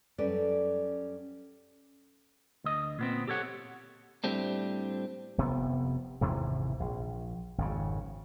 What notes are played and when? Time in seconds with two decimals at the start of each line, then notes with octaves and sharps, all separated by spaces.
0.18 F#2 G3 C#4 A4 B4 D5
2.64 D2 D#5
2.99 A#2 B3 C4
3.28 G4 A4 C#5 F#5
4.24 A2 G3 A3 C4 D4
5.38 F1 C3 B3
6.21 G#1 E2 C3 E3
6.80 A#1
7.58 G#1 F2 C#3